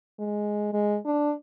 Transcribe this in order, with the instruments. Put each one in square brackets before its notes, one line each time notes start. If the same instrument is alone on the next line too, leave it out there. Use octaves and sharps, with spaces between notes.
[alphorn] G#3
G#3
D4